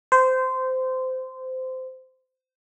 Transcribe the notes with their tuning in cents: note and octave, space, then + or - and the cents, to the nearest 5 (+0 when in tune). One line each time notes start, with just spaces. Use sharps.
C5 -20